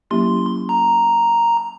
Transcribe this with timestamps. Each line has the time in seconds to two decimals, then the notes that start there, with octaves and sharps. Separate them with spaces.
0.11 F#3 A#3 C#4 E4 G4 C6
0.69 A#5